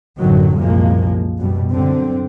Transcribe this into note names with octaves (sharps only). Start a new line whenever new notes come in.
A1 F#2 B2 D3 D#3 F#3
C2 F#2 A#2 F3 G#3 A#3
F#2 B2 G3
F#2 D3 C4